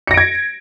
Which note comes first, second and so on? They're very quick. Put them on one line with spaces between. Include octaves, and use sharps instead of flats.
C#7 A#6 D7 G#6